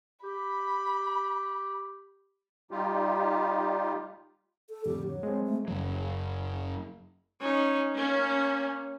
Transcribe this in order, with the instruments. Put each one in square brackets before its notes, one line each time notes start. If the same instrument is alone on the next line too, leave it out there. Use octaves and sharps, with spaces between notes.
[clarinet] G4 [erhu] B5
[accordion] G3 D#4 F4 G4
[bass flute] A4
[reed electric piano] F2 A2 D3 [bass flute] G4
[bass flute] F#3
[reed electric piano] G#3 C4
[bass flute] A3
[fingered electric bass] F#1 F#3
[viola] C#4 D#4
[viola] A#3 [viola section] C#4